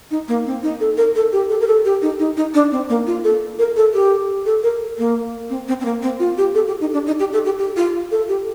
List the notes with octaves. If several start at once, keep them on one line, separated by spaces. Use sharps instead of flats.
D#4
A#3
C4
D#4
A4
A#4
A4
G4
A4
A#4
A4
G4
D#4
D#4
D#4
D4
C4
A#3
F4
A4
A#4
A4
G4
A4
A#4
A#3
C4
C4
C4
A#3
C4
F4
G4
A4
G4
D#4
D4
D#4
G4
A4
G4
G4
F4
A4
G4